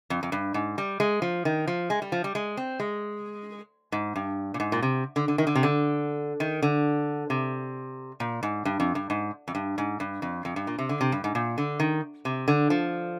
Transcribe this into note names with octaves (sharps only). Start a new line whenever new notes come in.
F2
F2
G2
G#2
G3
G#3
F3
D#3
F3
G#3
G3
F3
G3
G#3
C4
G#3
G#2
G2
A#2
G#2
A#2
C3
D3
D3
D#3
D3
C3
D3
D#3
D3
C3
A#2
G#2
G2
F2
G2
G#2
F2
G2
G#2
G2
F2
F2
G2
A#2
C3
D3
C3
G2
G#2
A#2
D3
D#3
C3
D3
F3